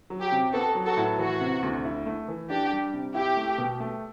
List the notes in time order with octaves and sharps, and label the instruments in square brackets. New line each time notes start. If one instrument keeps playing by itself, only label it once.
[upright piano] F#3
[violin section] G4
[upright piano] C3
[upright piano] B3 [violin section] F#4 A4
[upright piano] F#3
[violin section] F#4 A4
[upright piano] A2
[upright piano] E3 [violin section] F#4
[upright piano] C3
D2
E4
A3
E3
[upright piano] D4 [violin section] G4
[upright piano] G3
C3
[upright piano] E4 [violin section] G4
[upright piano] A3
B2
A3